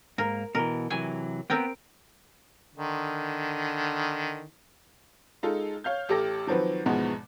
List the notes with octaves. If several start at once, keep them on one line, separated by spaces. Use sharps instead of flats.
G#2 A#3 A#4
B2 D#3 E3 A#4
C3 E3 F#3 G#5
B3 C4 A#4 G5
D3 D#3
G#3 D#4 F4 A4
C#5 F5 F6 G6
A1 G4 A4 D6 A#6
D#3 F3 F#3 C4 B4
E2 G#2 B2 F3 G#3 B3